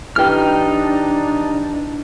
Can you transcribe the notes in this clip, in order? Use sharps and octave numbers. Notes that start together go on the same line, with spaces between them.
E3 D4 D#4 G4 G5 F6